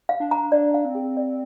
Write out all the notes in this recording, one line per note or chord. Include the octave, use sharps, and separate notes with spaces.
F5
D4
A#5
D4 D5
F5
C4
G#4
D5